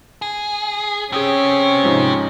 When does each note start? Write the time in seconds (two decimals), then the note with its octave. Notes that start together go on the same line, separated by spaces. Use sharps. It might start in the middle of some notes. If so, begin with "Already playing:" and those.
0.22 G#4
1.12 C4 C#4 G4 G#4 D#6 E6
1.84 G#2 F3 D#4